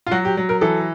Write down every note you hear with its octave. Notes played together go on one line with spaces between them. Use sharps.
F4
F#3 F#4
G4
F#3
A#4
E3 A4